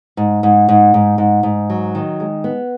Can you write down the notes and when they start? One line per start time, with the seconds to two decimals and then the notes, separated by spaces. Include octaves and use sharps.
0.17 G#2
0.43 G#2
0.69 G#2
0.94 G#2
1.18 G#2
1.43 G#2
1.70 F#3
1.95 D#3
2.20 G#3
2.44 B3